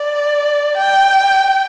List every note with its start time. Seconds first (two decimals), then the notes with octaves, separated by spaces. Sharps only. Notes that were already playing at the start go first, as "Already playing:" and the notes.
Already playing: D5
0.77 G5